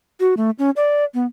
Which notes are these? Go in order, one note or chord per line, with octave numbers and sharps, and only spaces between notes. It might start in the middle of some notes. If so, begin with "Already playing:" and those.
F#4
A3
C#4
D5
B3